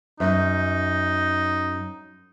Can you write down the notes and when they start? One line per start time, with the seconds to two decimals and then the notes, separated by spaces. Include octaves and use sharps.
0.20 F#2 D#4